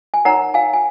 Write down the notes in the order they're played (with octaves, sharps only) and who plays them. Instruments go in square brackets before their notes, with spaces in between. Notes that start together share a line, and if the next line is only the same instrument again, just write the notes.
[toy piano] G#5
D#4 A#4 C#5 F#5 A#5
F5 G#5
G#5